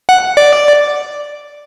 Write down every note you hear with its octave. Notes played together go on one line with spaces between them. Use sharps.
F#5
D5